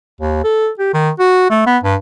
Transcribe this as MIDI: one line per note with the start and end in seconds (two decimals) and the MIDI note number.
0.21 0.39 39
0.44 0.69 69
0.79 0.89 67
0.94 1.10 51
1.19 1.45 66
1.50 1.63 57
1.66 1.78 59
1.83 1.95 43